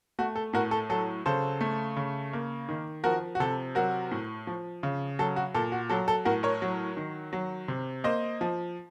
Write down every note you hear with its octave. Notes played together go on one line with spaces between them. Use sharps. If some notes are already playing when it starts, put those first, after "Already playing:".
A3 F#4
A4
A2 F#4 A#4
A4
F#3 A4
C#3 A4 C5
A3
C#3
A#3
D#3
F3 F#4 A#4
F#4
C3 A4
F#3 F#4 A#4
A2
F3
C#3
F#3 A4
F#4
A#2 A4
F#4
F#3 A4
A4
A2 F#4 A#4
A#4 C#5
F#3
D#3
F#3
C3
A#3 C5 D#5
F3